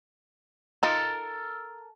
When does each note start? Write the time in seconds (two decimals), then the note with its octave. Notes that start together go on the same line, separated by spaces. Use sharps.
0.83 D#4 F4 A4 A#4